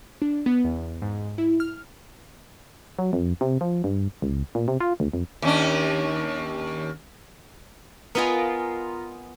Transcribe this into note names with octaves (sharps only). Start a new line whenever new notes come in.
D4
B3
E2
G#2
E4
F6
F#3
F2
C3
F3
G2
C#2
A#2
C3
F4
D2
F2
D#2 C#4 D4
B3 F4 A#4 D#5 G#5